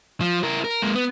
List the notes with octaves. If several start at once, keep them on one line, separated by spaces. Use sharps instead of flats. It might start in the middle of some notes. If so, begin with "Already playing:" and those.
F3
E4 A#4
A#4
G#3 A#3
B3